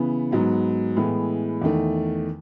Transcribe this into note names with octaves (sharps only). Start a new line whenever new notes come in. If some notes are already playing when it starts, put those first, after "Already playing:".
Already playing: C#3 E3 B3
G#2 F#3 B3
A2 E3 G#3 B3
E2 D#3 A3